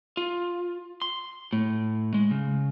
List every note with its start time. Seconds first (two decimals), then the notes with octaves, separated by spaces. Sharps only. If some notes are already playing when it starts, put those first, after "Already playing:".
0.17 F4
1.02 C6
1.53 A2
2.14 G#3
2.31 C#3